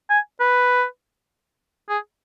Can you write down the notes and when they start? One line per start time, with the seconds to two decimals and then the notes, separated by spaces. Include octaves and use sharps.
0.10 G#5
0.40 B4
1.89 G#4